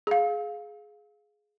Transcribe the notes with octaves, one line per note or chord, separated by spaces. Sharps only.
G#4 F5